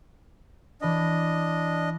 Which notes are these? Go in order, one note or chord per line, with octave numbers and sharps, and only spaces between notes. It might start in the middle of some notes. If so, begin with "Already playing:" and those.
E3 D4 D#5 B5